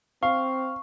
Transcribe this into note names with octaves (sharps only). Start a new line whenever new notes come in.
C4 F5 C#6